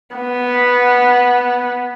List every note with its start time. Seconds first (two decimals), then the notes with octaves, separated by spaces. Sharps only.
0.16 B3